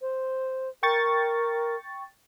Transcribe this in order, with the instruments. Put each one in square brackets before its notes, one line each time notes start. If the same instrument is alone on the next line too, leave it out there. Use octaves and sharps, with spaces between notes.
[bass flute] C5
[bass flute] A#4 [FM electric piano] G5 C#6 A6